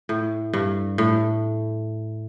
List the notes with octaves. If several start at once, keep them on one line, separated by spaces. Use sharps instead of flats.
A2
G2
A2